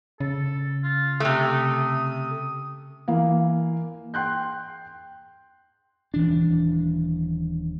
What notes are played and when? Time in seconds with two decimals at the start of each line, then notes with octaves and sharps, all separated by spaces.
0.20 C#3 A4
0.84 F4
1.20 C3 A3 D#6
3.08 E3 A#3 F5
4.14 G5 C6 F#6 G6
6.14 D#1 E3 D4